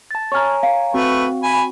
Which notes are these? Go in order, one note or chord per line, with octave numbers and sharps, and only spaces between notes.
A5 A6
C#5 G#5 A#5 C#6 F6
F5
A3 C4 F#4 B4 C#6
G#5 B5